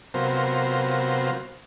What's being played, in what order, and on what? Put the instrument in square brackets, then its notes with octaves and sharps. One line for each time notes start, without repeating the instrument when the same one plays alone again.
[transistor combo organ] C3 F#3 B3 F4 A#4 C5